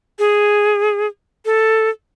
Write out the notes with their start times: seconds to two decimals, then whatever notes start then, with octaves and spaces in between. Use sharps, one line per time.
0.19 G#4
1.45 A4